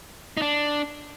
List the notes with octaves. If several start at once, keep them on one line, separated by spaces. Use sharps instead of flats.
D#4
D4